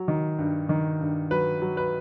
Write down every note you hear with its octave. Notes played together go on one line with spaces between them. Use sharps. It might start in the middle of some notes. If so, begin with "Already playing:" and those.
Already playing: F#3
D#3
G2
D#3
G2
F#3 B4
F#3
B4